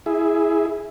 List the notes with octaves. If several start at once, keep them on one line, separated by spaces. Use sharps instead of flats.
E4 G#4